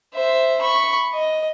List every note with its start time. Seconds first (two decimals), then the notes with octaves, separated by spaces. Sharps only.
0.14 C5 E5
0.61 B5 C#6
1.14 D#5